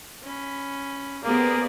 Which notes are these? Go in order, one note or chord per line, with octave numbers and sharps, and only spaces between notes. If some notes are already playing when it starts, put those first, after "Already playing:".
C#4 B5
A#3 B3 G4 G#4 C5 D5